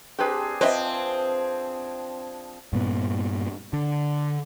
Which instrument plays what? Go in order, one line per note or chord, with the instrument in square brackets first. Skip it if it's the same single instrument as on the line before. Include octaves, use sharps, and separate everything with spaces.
[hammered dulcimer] C4 D4 G#4 [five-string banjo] G4 B4
[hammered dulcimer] F3 [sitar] C4 [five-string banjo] B4 D#5 E5
[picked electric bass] G2 A#2 B3
D3